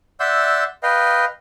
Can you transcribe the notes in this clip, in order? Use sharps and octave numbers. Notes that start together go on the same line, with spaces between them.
D5 E5 F#5 C6 E6 G6
B4 D#5 F5 G5